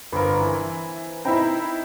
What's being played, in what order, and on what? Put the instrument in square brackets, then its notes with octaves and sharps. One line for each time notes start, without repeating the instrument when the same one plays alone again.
[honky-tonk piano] G1 A#4 [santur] A#3 C4 B4
[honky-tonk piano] E3
[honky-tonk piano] C4 D#4 E4 [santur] G5 A#5 B5